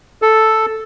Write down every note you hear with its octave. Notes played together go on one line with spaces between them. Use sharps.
A4